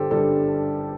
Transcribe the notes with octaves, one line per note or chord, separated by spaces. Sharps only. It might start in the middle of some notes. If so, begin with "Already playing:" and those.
Already playing: G1 G2 G3 G4 A4 C5
G1 G2 D3 G3 A4